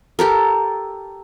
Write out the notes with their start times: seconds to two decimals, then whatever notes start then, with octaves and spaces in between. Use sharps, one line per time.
0.19 G4 A4 A#4